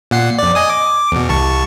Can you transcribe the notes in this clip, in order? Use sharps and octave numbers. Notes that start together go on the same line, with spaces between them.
A#2 F#5 C7
F2 D5
D#5 G#5 D#6
D6
E2 B2
C2 A5 C#6